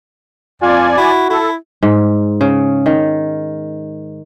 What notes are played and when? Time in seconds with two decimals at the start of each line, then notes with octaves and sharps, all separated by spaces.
0.62 F2 F4 D5 G#5
0.98 E4 F#4
1.30 E4 A4
1.83 G#2
2.41 C#3
2.86 D#3